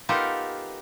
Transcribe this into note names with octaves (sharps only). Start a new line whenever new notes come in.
B3 D#4 F4 G4 A4 A#4